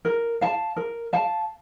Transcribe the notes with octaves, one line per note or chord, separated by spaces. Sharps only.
A#4
F5 A5
A#4
F5 A5